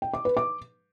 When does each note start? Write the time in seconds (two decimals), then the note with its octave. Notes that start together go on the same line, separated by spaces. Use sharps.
0.02 G5
0.14 D6
0.25 B4
0.37 D6